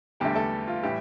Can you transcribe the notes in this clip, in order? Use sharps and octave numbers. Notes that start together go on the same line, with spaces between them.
E2 D3 G3 A3 G4
A3 A4
F4
A2 E3 G3 G4